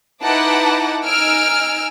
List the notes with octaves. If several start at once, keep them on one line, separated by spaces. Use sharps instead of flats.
D#4 E4 B4 F#5 A5 D6
D#4 G#5 E6 F6 D7